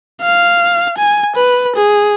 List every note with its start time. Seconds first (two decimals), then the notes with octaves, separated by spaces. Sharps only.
0.22 F5
0.98 G#5
1.36 B4
1.76 G#4